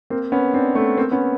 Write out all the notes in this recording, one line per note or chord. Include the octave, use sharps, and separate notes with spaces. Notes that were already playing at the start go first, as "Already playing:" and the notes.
A#3 C4
B3 C#4
C4 D4
A3 B3
A#3 C4
B3 C#4